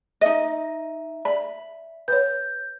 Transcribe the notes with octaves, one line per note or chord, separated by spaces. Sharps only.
D#4 D#5 E5
D5 B5
B4 C#5 G6